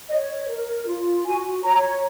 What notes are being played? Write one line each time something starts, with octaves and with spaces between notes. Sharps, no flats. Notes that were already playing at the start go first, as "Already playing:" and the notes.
C#5 D#5
A#4
F4
F#4 G#5
C#5 A#5